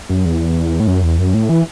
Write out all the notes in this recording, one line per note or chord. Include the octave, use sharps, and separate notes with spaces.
F#2
E2
A2
F#2
E2
F#2
A2
E3